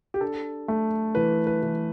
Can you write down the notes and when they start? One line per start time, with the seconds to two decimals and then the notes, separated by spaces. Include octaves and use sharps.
0.14 G4
0.21 D4 A4
0.68 A3
1.15 E3 B4
1.47 B4
1.63 E3